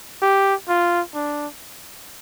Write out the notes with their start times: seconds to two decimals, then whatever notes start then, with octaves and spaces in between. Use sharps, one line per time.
0.22 G4
0.69 F4
1.15 D4